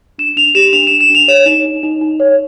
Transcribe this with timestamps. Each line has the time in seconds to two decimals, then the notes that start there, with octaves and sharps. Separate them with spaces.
0.18 D4 E7
0.36 D4 F7
0.55 G4 E7
0.73 D4 F7
0.87 E7
0.91 D4
1.00 E7
1.10 D4 F7
1.28 C#5 E7
1.46 D#4
1.65 D#4
1.83 D#4
2.01 D#4
2.20 C#5